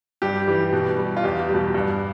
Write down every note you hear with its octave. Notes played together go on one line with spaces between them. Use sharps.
G2 G4
E3 G3
B2
G3
F4
E2 G4
B2 G3
G2